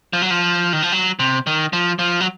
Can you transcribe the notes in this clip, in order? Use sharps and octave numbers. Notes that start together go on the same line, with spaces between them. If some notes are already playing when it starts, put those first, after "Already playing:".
F3
F#3
F3
D#3
F3
F#3
C3
D#3
F3
F3
F#3